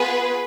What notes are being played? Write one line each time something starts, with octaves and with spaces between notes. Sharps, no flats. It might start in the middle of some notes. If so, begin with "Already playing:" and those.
Already playing: B3 F4 G#4 B4